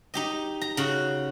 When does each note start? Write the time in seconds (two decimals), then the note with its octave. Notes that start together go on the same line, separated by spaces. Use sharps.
0.14 D#4 G4 D#5
0.61 A#5
0.77 C#3 F#4